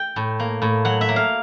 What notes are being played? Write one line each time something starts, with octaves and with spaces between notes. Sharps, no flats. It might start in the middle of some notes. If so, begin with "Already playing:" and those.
Already playing: G5
A2
A#3
A2
F#3 F#5
E5
A#3
F5